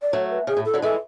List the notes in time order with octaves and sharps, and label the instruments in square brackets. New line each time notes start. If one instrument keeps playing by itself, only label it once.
[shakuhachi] D5
[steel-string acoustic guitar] F#3 A3 [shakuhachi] C#5
[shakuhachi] B4
[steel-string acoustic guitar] C#3 [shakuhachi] G#4
[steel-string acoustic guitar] A2
[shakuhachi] A4
[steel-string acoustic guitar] D3 F#3
[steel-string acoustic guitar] E3 G#3 [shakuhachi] A4